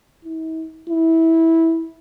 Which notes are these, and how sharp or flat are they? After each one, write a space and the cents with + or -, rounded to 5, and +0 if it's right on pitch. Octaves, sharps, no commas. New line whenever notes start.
E4 -45
E4 -15